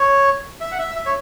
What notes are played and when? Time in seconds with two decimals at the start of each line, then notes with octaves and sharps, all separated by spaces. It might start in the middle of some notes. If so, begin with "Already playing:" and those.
Already playing: C#5
0.61 E5
0.72 F#5
0.78 E5
0.96 E5
1.06 C#5